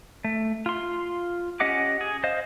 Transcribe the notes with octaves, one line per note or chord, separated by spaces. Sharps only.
A3
F4 C6
C#4 G4 D#5 F#5 D6
G#4
C5 D#5 F5